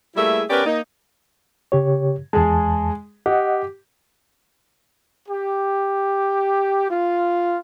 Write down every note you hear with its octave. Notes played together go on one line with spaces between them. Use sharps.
G3 A3 A#3 E4 G#4 E5
B3 C#4 G4 A#4 B4 D5
A#3 D#4
C#3 G4 C#5
E2 G#3 G#4 A5
G4 D#5 F#5
G4
F4